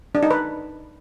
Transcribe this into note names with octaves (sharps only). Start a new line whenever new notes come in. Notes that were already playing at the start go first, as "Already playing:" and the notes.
D4
D#4
B4